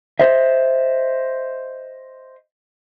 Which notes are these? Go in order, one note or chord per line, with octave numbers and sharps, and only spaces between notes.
C5 D#5 E5